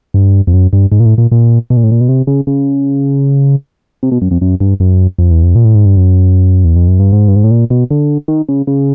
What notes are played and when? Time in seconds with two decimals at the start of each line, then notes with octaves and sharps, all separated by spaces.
0.14 G2
0.47 F2
0.54 F#2
0.73 G2
0.92 G#2
1.00 A#2
1.05 A2
1.18 A#2
1.32 A#2
1.70 B2
1.77 A#2
1.84 A2
1.91 A#2
2.01 B2
2.09 C3
2.27 C#3
2.47 C#3
4.03 C3
4.12 B2
4.22 F#2
4.31 F2
4.41 F#2
4.60 G2
4.80 F#2
5.19 F2
5.31 E2
5.43 F2
5.55 A#2
5.65 A2
5.75 G#2
5.86 G2
5.97 F#2
6.64 E2
6.76 F2
6.88 F#2
7.00 G2
7.13 G#2
7.28 G2
7.36 G#2
7.44 A2
7.51 A#2
7.70 B2
7.91 D3
8.28 D#3
8.49 C#3
8.67 C#3